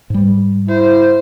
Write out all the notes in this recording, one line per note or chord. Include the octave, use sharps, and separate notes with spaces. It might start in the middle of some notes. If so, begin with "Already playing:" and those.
G#2 G3
E4 C5